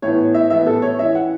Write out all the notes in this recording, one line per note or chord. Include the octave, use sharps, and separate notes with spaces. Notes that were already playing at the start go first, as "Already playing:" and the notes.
A2 E3 B3 C#5
E5
A2 E3 B3 E5
A4
C#5
E3 C#4 E5
F#5